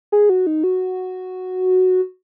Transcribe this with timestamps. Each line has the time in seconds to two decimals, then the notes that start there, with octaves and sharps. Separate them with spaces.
0.12 G#4
0.29 F#4
0.47 D#4
0.64 F#4